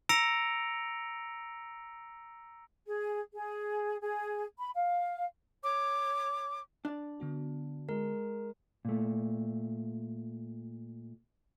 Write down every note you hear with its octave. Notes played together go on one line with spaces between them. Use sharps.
A#5 E6 A#6 C#7 D7 F7
G#4
G#4
G#4
B5
F5
C#5 D6
D4 D5
D3 B3 F#4
G#3 A#4
A#2 A3